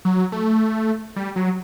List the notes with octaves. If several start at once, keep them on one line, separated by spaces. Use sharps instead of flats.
F#3
A3
G3
F#3